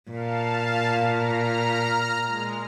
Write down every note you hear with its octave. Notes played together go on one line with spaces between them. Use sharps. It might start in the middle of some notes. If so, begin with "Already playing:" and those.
A#2 F5 A5
A#5 F6
G#3